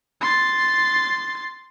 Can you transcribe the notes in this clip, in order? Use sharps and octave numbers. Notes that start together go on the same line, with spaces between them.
C6 A6